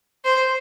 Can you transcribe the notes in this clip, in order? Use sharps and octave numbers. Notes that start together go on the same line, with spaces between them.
C5